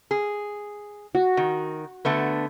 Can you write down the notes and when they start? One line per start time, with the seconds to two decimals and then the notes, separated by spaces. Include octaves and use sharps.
0.11 G#4
1.15 F#4
1.37 D#3
2.05 D3 A3 B3